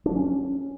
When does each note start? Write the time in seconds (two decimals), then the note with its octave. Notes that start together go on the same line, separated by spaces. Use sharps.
0.06 D4
0.11 F#3
0.16 C#4